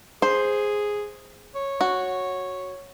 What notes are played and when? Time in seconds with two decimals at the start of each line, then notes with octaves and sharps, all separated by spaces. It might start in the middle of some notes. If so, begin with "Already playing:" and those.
0.22 G#4 C5
1.55 C#5
1.81 F#4